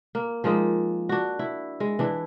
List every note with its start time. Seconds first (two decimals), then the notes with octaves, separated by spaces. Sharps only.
0.15 A#3
0.44 F3 G#3 A#3 D#4
1.09 D4 F#4
1.39 E4
1.80 G#3
1.99 E3 D4 E4